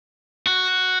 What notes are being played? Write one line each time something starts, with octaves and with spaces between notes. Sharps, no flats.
F#4